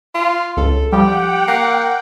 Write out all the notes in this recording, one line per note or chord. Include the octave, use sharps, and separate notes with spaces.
F4
C#2 A4
F3 G3 G4 F#5 G5
A#3